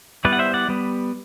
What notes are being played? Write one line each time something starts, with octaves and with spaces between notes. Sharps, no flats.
G3 B3 E4 B4 D5
F#5
C5 E5
D5 F#5
G3 B3